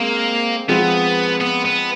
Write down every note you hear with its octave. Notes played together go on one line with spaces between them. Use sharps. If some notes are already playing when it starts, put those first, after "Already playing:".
Already playing: G#3 A#3 C4 G#4
F3 G#3 B3 C4
B3
B3